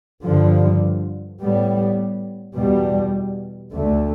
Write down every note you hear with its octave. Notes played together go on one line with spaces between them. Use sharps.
G2 D3 F3
A2 G3 B3
E2 B2 G3
D2 D3 A3